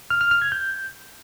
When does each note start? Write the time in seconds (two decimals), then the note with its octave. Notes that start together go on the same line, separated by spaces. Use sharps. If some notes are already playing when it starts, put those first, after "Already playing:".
0.10 F6
0.21 F6
0.31 F6
0.42 G#6
0.52 G6